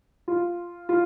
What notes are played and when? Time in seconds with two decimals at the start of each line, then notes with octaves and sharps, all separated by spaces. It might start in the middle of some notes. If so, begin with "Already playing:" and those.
0.28 F4
0.89 F4